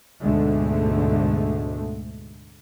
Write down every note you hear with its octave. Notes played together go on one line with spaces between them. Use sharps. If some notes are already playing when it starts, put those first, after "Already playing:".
D2 G#2 B2 D3 G#3 A3